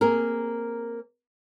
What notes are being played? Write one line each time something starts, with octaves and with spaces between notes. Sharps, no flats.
A#3 C4 G#4 A#4